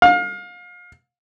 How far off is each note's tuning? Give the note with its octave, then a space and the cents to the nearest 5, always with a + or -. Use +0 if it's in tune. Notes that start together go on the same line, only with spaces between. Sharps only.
F5 +30